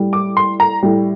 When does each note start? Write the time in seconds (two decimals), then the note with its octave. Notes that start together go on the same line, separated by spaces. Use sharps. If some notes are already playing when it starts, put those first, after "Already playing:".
Already playing: A2 G3
0.13 D6
0.37 C6
0.60 A#5
0.83 A2 G3